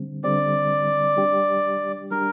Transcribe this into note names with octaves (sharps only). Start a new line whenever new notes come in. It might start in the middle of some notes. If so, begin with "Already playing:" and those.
Already playing: D3 G3 C4
D3 G3 C4 D5
G3 D4 G4
G3 D4 G4 A#4